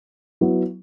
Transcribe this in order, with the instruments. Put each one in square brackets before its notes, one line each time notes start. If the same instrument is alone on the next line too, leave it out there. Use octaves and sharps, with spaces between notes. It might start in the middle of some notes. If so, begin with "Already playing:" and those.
[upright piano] F#3 B3 E4